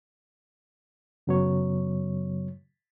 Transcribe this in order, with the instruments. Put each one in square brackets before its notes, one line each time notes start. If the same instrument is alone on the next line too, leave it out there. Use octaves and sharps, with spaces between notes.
[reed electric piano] F#2 C#3 F#3 B3 C#5